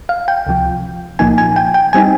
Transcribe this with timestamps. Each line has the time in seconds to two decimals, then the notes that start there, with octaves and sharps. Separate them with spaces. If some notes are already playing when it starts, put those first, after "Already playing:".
Already playing: A#1
0.09 F5
0.28 G5
0.47 C#2 C3 F3
1.19 C2 A#2 F3 A#3 D#4 G#5
1.38 G#5
1.56 G5
1.74 G5
1.93 G3 C4 D#4 G#5